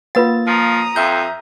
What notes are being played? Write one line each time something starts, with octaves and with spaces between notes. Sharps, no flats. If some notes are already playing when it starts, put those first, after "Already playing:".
A#3 F4 B4 F#5 A6
F3 A#5 D#6
F2 E5 G6